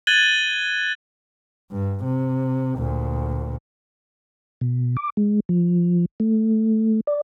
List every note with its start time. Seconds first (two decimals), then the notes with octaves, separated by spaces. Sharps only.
0.07 F#6 G#6 A6 D#7 F#7 G7
1.72 G2
2.04 C3
2.76 D2 A#2
4.61 B2
4.97 D6
5.17 G#3
5.49 F3
6.20 A3
7.07 D5